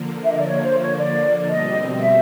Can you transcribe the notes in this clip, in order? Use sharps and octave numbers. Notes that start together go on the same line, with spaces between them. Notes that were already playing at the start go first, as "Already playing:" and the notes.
Already playing: D3 F3 A#3
E5
D#5
D5
C#5
C5
C#5
D5
B2 G3 C4 D#5
E5